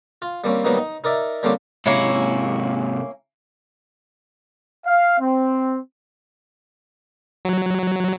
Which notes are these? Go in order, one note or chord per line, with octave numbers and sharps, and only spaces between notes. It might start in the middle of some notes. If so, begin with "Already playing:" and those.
F4
G3 A#3 C4 C#4
D#3 F#3 G3 A#3 B3 D#4
D#4
D#4 A#4 D5 E5
D3 G3 A#3 C4 C#4 G4
G#2 C3 A#3 C#4 E4
F5
C4
F#3